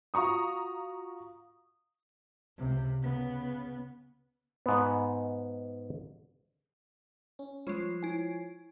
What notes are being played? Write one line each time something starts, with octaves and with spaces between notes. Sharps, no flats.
F4 F#4 A#5 C#6 D#6
C#2 C3
C#3 B3
G#2 B3
C#4
F3 G3 G#3 C#5 C7
E4 G#5